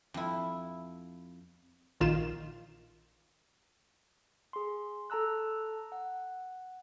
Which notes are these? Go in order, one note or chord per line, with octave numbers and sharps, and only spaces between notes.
F2 E4
A#1 D#3 F4 E7
G#4 C6
A4 A5 A#5 E6 F#6
F#5